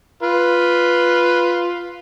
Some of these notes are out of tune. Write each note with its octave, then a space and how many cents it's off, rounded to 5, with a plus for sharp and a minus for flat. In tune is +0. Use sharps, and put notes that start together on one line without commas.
F4 +0 B4 +0